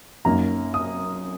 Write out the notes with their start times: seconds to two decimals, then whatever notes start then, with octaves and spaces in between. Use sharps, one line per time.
0.25 F#2 F#3 A#3 D#4 A#5
0.74 D#6